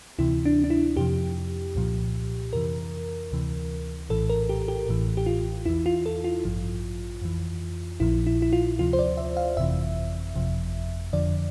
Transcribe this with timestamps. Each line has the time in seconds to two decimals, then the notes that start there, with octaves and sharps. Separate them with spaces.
0.18 D2 C3 E3 E4
0.45 D4
0.64 D4
0.70 E4
0.96 F2 C3 F3 G4
1.75 C2 A#2 F3
2.53 F2 C3 E3 A#4
3.32 D2 C3 E3
4.09 A#1 A2 E3 A4
4.30 A#4
4.49 G4
4.68 G4
4.87 A1 A2 E3
5.17 G4
5.26 F4
5.66 E2 E3 E4
5.86 F4
6.06 A4
6.24 F4
6.44 A1 G2 F3
7.22 F2 E3
8.00 A#1 A#2 F3 E4
8.27 E4
8.42 E4
8.53 F4
8.79 D2 C3 F3 F4
8.93 C5
8.99 D5
9.17 E5
9.37 F5
9.56 G1 F2 C3 E3 E5
10.34 G1 F2 C3 F3
11.13 F2 D3 F3 D5